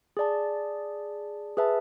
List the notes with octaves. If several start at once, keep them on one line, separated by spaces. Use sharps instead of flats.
G#4 D5 A5
G#4 B4 E5 A5